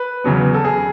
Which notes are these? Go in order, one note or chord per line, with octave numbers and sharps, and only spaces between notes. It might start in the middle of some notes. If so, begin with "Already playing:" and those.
Already playing: B4
E2 C#3 F#3 B3
A4
G#4